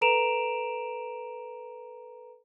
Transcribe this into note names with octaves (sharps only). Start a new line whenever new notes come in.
A4 B4 A#5 D7 E7 F7